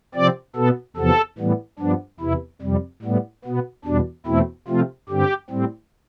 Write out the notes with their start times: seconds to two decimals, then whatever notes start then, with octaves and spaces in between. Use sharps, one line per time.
0.15 C3 F3 C4 D5
0.56 B2 B3 A4
0.96 E2 C3 F3 B3 A4
1.38 A2 E3 G3 B3
1.79 G2 F3 B3 D4
2.20 E2 C3 E3 E4
2.62 F2 C3 G3
3.02 A2 G3 B3
3.45 B2 B3
3.85 E2 B2 G3 D4
4.26 E2 B2 A3 C4 E4
4.68 C3 F3 A3 C4 F4
5.09 G2 D3 G3 C4 G4
5.50 A2 G3 C4